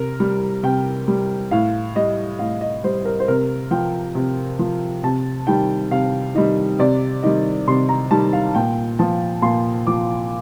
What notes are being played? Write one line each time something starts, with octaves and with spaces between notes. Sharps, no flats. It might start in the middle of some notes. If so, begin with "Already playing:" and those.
Already playing: C3 A#4
G3
C3 G5
G3
A2 F5
G3 D#5
A2 F5
D#5
G3 C5
A#4
C5
C3 A#4
F3 G5
C3
F3
C3 A5
D#3 G3 G5
C3 F5
D#3 G3 D#5
C3 D5
D#3 G3 D#5
C3 C6
A#5
D#3 G3 A5
F5
A#2 G5
F3 A5
A#2 C6
F3 D6